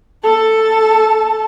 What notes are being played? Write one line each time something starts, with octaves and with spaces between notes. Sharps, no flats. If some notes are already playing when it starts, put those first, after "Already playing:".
A4 A5